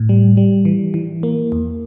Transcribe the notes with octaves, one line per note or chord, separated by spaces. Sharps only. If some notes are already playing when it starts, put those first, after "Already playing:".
Already playing: A2
G3
G3
E3
E3
A#3
E2